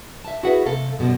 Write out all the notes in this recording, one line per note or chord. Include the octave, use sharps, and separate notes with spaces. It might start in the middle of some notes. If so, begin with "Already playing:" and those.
E5 A5
E4 F#4 G#4 B4 E5 F#5
C3 A3 A4 F5
F#2 B2 D#3 F3 G3